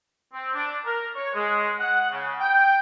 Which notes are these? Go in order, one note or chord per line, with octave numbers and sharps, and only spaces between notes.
C4
D4
A#4
C#5
G#3
F#5
C#3
G5